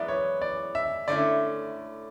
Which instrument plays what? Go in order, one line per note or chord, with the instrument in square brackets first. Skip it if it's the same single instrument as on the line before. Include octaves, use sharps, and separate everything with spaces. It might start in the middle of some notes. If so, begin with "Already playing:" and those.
Already playing: [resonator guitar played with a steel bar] F#2 E3 G#3 B3 E4 [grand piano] D5
[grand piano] C#5
D5
E5
[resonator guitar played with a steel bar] D3 A3 C#4 E4 [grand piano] D5